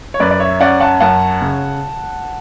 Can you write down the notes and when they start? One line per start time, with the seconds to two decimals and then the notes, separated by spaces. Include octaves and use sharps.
0.14 C#5
0.20 F#2 B4 D5
0.31 D5
0.40 C#5 E5
0.60 C#4 D5 F#5
0.80 F#5 A5
1.00 F#2 F#5 A5
1.41 C#3